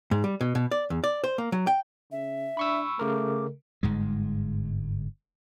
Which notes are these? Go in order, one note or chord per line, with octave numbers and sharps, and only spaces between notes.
G#2
G3
B2
B2
D5
E2
D5
C5
A#3
F#3
G5
C#3 E5
D4 B5 C#6 E6
C#3 A3 A#4 D6
G1 G#2 G#3